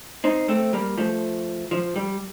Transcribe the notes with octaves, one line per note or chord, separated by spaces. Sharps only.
C4 D#4
A3 C4
G3 A#3
F3 A3
F3
G3